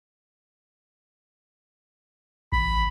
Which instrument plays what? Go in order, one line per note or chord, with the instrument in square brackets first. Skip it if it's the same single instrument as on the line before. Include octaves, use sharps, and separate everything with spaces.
[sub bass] A1 [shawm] B5